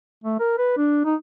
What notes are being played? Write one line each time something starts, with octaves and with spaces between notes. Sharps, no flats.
A3
A#4
B4
D4
D#4